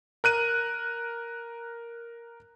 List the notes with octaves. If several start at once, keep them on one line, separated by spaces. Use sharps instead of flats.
A#4 F#6 D#7